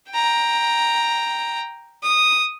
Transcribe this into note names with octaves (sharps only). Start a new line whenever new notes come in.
G5 A#5
D#6